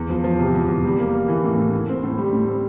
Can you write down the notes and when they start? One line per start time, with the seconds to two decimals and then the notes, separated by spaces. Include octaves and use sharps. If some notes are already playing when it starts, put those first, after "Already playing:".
Already playing: E2
0.10 F3
0.24 F3
0.39 C3
0.55 E2
0.68 E2
0.84 G3
0.99 A#3
1.14 A#3
1.28 E3
1.44 A2
1.58 A2
1.73 A2
1.89 C4
2.03 A2
2.18 G3
2.33 A2
2.48 C4